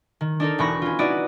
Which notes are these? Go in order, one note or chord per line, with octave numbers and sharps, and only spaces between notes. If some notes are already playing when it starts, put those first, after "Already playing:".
D#3
D4 D#4 A4 A#4
E1 E3 B5 C#6 A#6
C#4 F4
D#4 E4 F#4 B4 D5 D#5